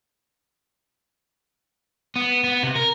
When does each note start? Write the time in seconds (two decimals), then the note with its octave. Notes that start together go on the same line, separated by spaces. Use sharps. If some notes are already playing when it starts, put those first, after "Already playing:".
2.16 B3
2.44 B3
2.63 C3
2.76 A#4